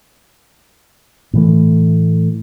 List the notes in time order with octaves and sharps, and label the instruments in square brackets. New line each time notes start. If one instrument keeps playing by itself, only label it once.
[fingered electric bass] A2 E3 A3